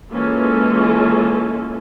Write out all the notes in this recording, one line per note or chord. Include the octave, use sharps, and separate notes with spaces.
E3 G#3 A#3 C#4 F4 A4